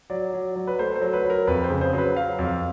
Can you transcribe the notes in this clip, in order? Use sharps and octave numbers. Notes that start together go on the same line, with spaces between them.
F#3 D5
F#3
F#3
B4
A3 C5
C5
F#3
B4
F#3 A#4
F2 B4
C5
C#3
C5
F#3 B4
F#3 F5
F2